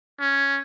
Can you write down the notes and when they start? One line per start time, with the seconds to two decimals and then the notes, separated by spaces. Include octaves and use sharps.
0.20 C#4